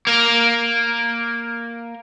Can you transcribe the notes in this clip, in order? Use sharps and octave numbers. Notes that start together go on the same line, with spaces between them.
A#3 A#4